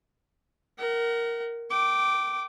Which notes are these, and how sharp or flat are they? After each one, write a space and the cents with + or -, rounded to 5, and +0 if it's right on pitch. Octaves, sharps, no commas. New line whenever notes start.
A#4 +0 F#5 +35
G5 -25 D6 +0